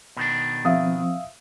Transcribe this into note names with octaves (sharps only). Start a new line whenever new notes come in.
B2 D#3 D4
F3 C4 E5 F5 D#6